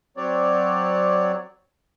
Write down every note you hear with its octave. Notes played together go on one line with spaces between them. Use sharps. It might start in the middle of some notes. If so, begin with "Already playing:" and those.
F#3 C4 C#5 D5